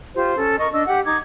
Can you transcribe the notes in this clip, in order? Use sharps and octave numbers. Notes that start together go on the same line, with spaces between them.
F4 G4 C5
C#4 A4
A#4 D#5 C#6
D4 D#5 E6
G4 F#5
D#4 D6 G#6